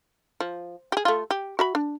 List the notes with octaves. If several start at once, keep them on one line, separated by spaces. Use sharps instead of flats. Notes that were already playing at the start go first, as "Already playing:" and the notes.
F3
G4 G#4
A3 F4
G4
F#4 E5 B5
D4